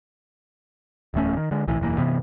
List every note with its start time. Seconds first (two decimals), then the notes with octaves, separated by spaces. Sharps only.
1.14 D1 E2 A3 C#4
1.37 D#3
1.51 D3 G#3
1.68 B1 A2 E3
1.80 E1 F#2 E3 A#3
1.98 G2 C3 E3 B3